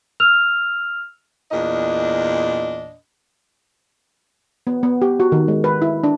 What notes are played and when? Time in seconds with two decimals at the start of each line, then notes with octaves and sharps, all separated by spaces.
0.20 E6 F6 F7
1.52 E2 A#2 D4 D#5
4.67 B3
4.83 B3
5.02 G4
5.20 F#4
5.32 D#3
5.48 G#3
5.64 B4
5.82 E4
6.04 D4